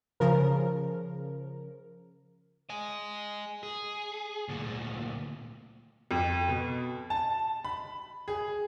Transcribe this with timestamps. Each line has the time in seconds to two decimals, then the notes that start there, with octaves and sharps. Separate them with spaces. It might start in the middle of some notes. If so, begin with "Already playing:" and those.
0.20 C#3 F3 A#4
2.70 D#5 G#5
3.63 G#4
4.48 D2 A#2
6.11 F2
6.48 B2
7.10 A5
7.65 B5
8.28 G#4